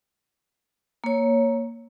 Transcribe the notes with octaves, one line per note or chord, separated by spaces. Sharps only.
A#3 C#5